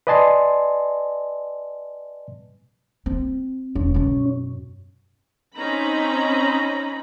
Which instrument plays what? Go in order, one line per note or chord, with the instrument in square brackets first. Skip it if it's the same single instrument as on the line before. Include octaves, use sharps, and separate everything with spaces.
[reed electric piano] B4 D5 D#5 G#5 A5 C6
[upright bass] C4
[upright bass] E1 [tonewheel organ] C#4
[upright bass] F#2 B2
[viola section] C4 C#4 D#4 A#5 B5